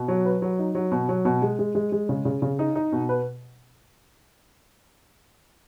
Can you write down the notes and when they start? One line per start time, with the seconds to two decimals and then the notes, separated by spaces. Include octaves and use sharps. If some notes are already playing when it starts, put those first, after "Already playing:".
Already playing: B2
0.08 F#3
0.25 B4
0.42 F#3
0.59 D#4
0.75 F#3
0.92 B2
1.09 F#3
1.25 B2
1.42 G#3
1.59 G#3
1.75 G#3
1.92 G#3
2.09 C#3
2.25 C#3
2.42 C#3
2.59 D#4
2.75 D#4
2.92 B2
3.09 B4